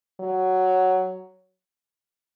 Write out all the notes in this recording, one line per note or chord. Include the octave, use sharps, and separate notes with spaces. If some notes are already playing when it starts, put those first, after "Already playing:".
F#3